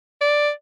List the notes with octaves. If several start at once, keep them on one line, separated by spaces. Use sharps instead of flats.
D5